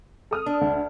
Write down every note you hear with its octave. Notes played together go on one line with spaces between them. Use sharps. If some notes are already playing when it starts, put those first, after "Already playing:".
A4 D#6 F6
D4
D2